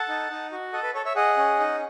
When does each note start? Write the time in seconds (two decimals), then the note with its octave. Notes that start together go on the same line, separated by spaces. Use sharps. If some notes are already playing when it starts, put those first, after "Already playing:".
Already playing: A4 F#5 A5
0.09 D#4
0.30 D#4
0.52 F#4
0.73 A4 D#5 F#5
0.83 B4
0.94 A4 C#5
1.05 C#5 E5
1.16 G#4 D#5 F#5
1.37 C#4
1.59 D#4